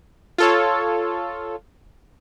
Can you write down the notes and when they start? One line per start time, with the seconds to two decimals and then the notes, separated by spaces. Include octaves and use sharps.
0.38 F4 A4 C#5